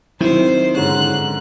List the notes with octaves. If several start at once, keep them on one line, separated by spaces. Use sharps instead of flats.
D#3 F#3 C4 E4 C5
G#2 D3 C#4 F#6